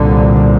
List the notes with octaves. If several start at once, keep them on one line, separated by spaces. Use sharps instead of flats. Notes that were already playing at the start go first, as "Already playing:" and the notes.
Already playing: C2 A#2 D3